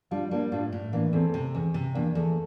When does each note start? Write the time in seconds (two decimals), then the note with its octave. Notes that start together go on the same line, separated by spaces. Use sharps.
0.11 G3 D4 F4
0.31 G3 A#3 D4
0.52 A2 D4 F4
0.72 A2
0.92 E3 A#3 D4
1.13 E2 A3 C4
1.34 C3
1.55 E2
1.74 C3
1.94 E2 A#3 D4
2.15 E2 A3